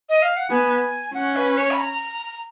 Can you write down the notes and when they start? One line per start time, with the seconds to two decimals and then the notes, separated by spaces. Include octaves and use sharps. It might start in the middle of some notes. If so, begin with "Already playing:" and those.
0.09 D#5
0.22 F5
0.36 F#5
0.50 B3 G#5
1.14 C#4 F#5
1.36 B4
1.57 C#5
1.71 B5
1.79 A#5